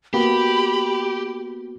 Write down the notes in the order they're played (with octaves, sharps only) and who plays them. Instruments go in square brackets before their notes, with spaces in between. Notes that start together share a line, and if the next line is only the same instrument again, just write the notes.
[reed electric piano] A#3 B3 F#4 [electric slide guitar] G4 [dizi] B5